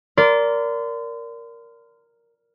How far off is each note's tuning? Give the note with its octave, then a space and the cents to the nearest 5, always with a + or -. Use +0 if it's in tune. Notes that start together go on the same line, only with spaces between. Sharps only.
A#4 +0 D5 -20 C6 -35